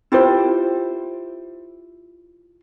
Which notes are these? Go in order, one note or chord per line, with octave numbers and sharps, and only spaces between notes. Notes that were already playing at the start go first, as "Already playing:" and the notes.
E4 F4 G4 C5